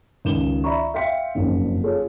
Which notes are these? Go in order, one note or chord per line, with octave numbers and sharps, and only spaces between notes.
C#2 D#3 E7 G7
D5 E5 A#5 B5 C#6
E5 F5 G5 C6 B6 C#7
F#1 F2 G#2 C#3
F4 G#4 A4 C#5